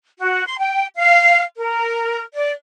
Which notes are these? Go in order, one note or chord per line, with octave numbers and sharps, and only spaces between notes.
F#4
C6
G5
F5
A#4
D5